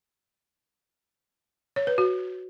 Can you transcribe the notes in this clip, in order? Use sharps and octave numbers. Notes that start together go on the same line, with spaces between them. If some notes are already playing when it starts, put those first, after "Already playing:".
C#5
B4
F#4